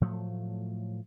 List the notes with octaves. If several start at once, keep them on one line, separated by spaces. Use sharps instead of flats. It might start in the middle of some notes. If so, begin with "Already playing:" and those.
A2 F3 F#3 A3